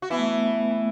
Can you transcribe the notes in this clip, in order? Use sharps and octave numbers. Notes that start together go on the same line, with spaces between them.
F#4
E3 B3 E4
A3
B3
A3